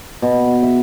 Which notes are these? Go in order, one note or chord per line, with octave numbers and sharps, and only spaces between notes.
B2
E5